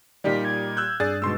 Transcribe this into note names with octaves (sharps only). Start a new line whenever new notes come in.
A#2 G3 D#4 G4 D5 B6
G#6
E6 F#6 G6
G2 G#4 D5 A6
G#2 B2 C6 E6